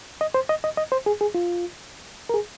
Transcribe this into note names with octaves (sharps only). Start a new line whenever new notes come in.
D#5
C5
D#5
D#5
D#5
C5
G#4
G#4
F4
A#4
G#4